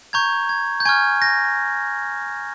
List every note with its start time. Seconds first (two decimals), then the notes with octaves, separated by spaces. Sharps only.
0.13 A#5 C#6 G6 G#6
0.49 G#6
0.80 G6
0.85 G#5 C#6 F6 G#6
1.22 G6 A#6